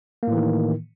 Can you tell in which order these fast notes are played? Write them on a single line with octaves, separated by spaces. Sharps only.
A#3 A2 E3 D#3